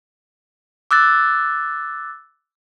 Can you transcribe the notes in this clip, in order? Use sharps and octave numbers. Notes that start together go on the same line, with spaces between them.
D6 E6 F#6 A6